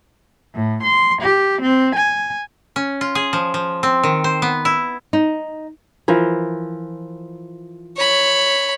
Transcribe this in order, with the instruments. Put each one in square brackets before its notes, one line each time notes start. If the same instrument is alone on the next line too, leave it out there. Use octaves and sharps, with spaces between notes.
[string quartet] A2
C6
G4
C4
G#5
[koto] C#4
F4
G#4
F3
F3
C4
D#3
C5
B3
E4
[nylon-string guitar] D#4
[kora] E3 F3 A#4
[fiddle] C#5 B5